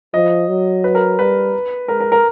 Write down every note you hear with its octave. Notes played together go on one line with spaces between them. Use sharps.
F3 D#5
F#3
B4
A#4
G3 B4
G#3 A#4
A#4
A#4